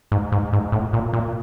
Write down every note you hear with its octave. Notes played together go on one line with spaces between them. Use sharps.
G#2
G#2
G#2
A2
A#2
A#2